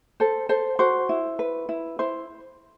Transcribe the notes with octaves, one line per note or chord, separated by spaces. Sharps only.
A4 C5
A4 C5
F#4 C5
E4
B4
E4
E4 C5